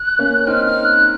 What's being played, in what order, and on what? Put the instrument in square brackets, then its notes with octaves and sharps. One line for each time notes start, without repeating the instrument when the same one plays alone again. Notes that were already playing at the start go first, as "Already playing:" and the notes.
Already playing: [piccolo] F#6
[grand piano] A#3 C#4
[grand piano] C4 D#4 [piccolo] F6
[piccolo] F6
F#6